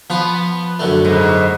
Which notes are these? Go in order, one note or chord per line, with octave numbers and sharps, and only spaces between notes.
F3 B3 F4
F#2 D3 A3
G#2 B2